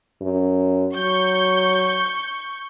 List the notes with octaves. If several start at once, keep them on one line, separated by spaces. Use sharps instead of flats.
F#2
F#3 C#6 G6